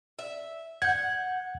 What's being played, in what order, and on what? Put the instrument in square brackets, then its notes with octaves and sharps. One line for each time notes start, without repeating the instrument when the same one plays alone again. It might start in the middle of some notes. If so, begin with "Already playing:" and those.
[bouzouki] E5
[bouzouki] F#5 [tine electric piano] G6 G#6